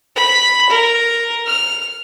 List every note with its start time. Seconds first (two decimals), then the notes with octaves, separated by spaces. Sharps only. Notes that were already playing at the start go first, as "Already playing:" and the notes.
0.16 B5
0.69 A#4
1.46 F6